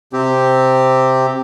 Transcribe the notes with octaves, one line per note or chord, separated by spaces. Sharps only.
C3 C4 G4